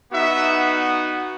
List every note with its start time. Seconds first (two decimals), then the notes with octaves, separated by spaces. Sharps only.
0.12 B3 D#4 F#4 E5